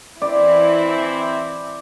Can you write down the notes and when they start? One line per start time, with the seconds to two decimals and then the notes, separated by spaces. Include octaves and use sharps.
0.22 E3 C4 E4 D5